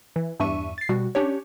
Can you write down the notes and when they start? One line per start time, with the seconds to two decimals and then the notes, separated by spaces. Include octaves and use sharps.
0.16 E3
0.40 E2 G2 D4 E5 C#6 D#7
0.78 A6 C7
0.89 B2 G3 F#4
1.15 C#4 D4 G4 C#5